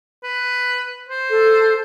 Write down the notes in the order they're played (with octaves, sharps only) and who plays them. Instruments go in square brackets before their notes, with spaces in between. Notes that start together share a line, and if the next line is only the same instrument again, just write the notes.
[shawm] B4
C5
[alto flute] A4